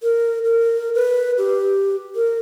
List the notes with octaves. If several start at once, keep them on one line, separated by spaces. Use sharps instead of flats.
A#4
A#4
B4
G4
A#4